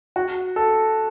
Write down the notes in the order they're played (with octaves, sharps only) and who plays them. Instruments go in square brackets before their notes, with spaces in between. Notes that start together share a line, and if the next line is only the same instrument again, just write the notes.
[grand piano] F#4
A4